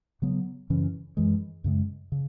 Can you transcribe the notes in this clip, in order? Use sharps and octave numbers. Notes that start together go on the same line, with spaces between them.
C#3 F#3 B3
F#2 C#3 E3 C#4
F#2 E3 G#3
F#2 C#3 G#3
C#3